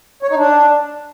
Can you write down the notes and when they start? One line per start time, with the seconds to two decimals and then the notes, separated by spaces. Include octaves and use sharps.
0.23 C#5
0.30 D#4
0.37 D4